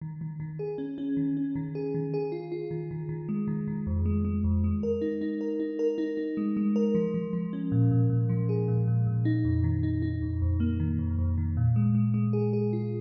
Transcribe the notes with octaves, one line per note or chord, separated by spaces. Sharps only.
D#3
D#3
D#3
G#4
C#4
C#4
D#3
C#4
D#3
G#4
D#3
G#4
F4
F4
D#3
D#3
D#3
G#3
D#3
D#3
F2
G#3
G#3
F2
G#3
A#4
D#4
D#4
A#4
D#4
A#4
D#4
D#4
G#3
G#3
A#4
F3
F3
F3
C#4
A#2
A#2
A#2
F3
G#4
A#2
A#2
A#2
D#4
F2
D#3
D#4
D#4
F2
F2
A#3
D#3
F2
F2
D#3
A#2
G#3
G#3
G#3
G#4
G#4
F4